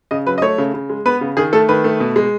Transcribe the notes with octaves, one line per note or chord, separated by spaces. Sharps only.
C#3 D#5
F#3 B4
D#5
A3 C#5
C#3
C#3
G#3
B3 B4
C#3
D#3 G#4
A3 A4
D#3 B4
A3
B2
G#3